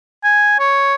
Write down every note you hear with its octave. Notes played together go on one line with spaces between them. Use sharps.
G#5
C#5